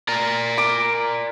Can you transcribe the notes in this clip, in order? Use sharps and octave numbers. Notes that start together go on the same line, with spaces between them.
A#4 D5 A#5
D6